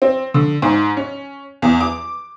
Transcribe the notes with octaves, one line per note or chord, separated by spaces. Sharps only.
C4
D3
G#2
C#4
E2
D6